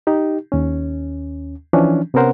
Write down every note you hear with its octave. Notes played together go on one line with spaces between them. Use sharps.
D#4 G4
D#2 C#4
E3 F3 C#4 D4
C3 B3 C#4 A#4 C5 F#5